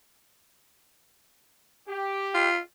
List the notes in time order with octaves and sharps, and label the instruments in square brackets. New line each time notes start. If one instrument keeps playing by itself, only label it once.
[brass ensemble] G4
[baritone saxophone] F4